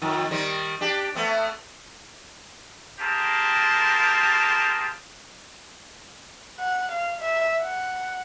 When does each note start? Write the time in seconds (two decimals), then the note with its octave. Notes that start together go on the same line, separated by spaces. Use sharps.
0.02 F2 D#3
0.31 D#3 G3 C4
0.81 D4 G4
1.15 A3 B3 C4
3.00 A#3 C4 G4 G#4 A#4 A5
6.60 F#5
6.91 F5
7.21 E5
7.62 F#5